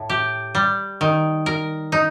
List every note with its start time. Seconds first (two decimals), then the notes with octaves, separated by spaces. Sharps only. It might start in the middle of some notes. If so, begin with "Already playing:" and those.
Already playing: A2
0.10 G4
0.55 G3
1.01 D#3
1.46 A#4
1.92 D#4